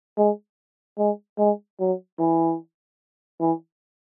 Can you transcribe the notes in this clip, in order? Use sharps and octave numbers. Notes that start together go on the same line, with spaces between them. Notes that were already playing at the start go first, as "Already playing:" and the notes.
G#3
G#3
G#3
F#3
E3
E3